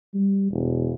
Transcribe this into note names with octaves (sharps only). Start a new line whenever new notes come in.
G3
E1